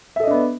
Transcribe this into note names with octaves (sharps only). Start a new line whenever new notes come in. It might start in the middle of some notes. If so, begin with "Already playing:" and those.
B3 D4 A4 D#5 E5